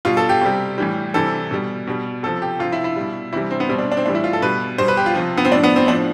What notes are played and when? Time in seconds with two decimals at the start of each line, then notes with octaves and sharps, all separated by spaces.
0.05 B2 G3 F4
0.17 A4
0.29 G4
0.42 C3 G3
0.78 A2 E3 G3
1.14 C3 E3 G3 A4
1.51 B2 G3
1.87 B2 G3
2.23 C3 F3 A4
2.42 G4
2.60 C3 F3 F4
2.72 E4
2.84 E4
2.96 B2 G3
3.33 C3 E3 G3 E4
3.51 C4
3.60 B3
3.69 B2 G3 C4
3.78 D4
3.92 D4
3.97 C4
4.06 A2 E3 G3 D4
4.15 E4
4.24 F4
4.33 A4
4.42 B2 G3 B4
4.78 B2 G3 C5
4.88 B4
4.97 G4
5.06 F4
5.15 C3 F3
5.38 B3
5.45 C4
5.52 A2 F3 D4
5.64 B3
5.76 C4
5.88 A2 F3 D4